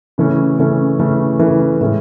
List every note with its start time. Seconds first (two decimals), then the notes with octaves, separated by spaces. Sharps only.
0.18 C#3 E3 A3 C#4
0.59 C#3 E3 A3 C#4
0.99 C#3 E3 A3 C#4
1.39 C#3 E3 A3 C#4
1.80 A2 E3 G#3 C#4